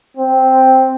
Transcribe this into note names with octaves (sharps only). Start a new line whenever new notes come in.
C4